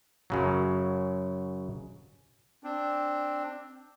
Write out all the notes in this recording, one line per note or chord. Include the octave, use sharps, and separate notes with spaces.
F#2 C#3 F#3
C4 D4